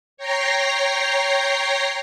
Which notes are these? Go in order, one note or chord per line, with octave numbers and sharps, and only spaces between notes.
C#5 G5 A#5 A#6 C7